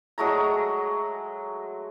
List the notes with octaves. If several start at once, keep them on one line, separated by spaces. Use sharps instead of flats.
F#3 G#3 A3 A#5